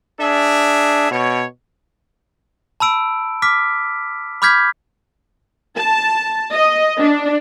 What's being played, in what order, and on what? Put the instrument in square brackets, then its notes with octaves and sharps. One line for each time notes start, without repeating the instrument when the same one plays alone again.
[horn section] D4 G#4 E5
B2 C#5
[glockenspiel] A5 B5 E6 D7
D6 F6 B6
B5 D6 F6 G6 G#6 B6
[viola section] A5
D#5
D4